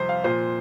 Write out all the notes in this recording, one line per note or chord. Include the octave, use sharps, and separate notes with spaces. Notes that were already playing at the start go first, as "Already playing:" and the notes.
Already playing: F2 C3 G3 C5
F5
A#2 F3 C5